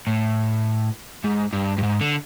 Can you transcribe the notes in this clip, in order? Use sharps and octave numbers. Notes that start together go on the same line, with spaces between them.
A2
G#2
G2
G2
G#2
D3